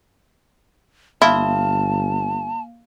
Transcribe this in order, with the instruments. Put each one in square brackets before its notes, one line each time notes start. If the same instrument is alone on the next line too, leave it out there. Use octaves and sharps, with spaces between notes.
[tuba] G1 [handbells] A#3 F5 F6 [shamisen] E4 [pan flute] A5